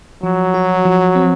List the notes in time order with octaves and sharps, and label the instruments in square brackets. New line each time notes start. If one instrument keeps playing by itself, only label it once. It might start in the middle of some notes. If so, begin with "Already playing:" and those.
[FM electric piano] F3 [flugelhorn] F#3
[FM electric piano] F#4
F3
C4